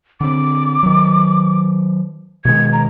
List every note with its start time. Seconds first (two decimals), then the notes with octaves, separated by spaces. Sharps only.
0.21 D3 C4 D6
0.83 D#3 F#3
2.45 B2 D#3 G#3 G#6
2.73 A#5